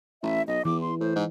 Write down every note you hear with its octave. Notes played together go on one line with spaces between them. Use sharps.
A1 E5
B1 D#5
E2 E3 D6
C6
A2 C5
G#2